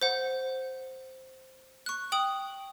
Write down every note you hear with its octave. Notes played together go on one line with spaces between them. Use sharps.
C5 F#5
C#6 F#6
G5 D#6 F#7